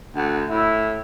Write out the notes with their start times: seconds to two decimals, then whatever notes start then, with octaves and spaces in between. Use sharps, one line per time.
0.16 D2 F#5
0.49 A2 E4